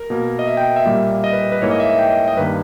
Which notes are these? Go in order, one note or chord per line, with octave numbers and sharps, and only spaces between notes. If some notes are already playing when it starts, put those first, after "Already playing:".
Already playing: A#4
B2 A#3
D#5
E5
G5
E5
A#2 G3 A#3
D#5
B4
B4
G#2 E3 A#3 C#5
D#5
E5
E5
G5
D#5
D#5
G2 D#3 A#3 B4